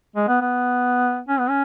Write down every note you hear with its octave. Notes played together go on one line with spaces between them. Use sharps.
G#3
B3
B3
C#4
B3
C#4